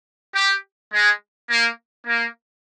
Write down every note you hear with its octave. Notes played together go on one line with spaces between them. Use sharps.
G4
G#3
A#3
A#3